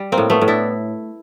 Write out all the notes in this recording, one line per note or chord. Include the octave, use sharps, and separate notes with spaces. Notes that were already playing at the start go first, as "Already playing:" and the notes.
Already playing: G3
A#3 C4
A2
A3 B3
A2
D4 E4